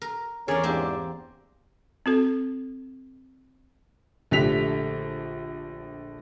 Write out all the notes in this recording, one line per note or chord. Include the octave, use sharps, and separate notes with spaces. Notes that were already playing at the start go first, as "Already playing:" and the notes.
A#4
E2 C#4 D4 G#4 A#4 C#5 D5
E2 G#2 A#3 C4 G4
C4 F#4 A4
A#1 D3 A3 G4 B6 F7